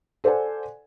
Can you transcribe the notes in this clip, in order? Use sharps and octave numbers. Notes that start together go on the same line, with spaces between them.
A4 C5 D5 F#5 G#5